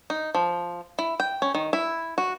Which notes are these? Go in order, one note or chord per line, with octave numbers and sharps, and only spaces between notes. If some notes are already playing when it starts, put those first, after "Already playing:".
D#4
F3
E4
G5
C#4
D#3
E4
F#4